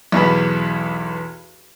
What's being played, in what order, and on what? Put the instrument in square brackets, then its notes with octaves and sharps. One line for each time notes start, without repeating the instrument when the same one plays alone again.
[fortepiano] B1 E2 B3 B5